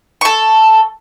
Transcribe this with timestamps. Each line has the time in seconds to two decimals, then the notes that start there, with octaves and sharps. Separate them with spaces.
0.21 A4 C#6